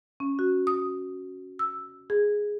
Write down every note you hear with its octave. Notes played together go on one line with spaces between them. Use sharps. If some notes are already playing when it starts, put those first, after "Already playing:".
C#4
F#4
D#6
E6
G#4